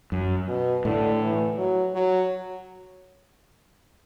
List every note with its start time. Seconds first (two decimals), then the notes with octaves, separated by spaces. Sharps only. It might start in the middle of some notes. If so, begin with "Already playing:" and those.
0.12 F#2
0.48 B2
0.85 A2 D3
1.22 E3
1.58 F#3
1.94 F#3